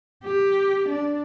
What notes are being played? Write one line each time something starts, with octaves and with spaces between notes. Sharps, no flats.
G4
D4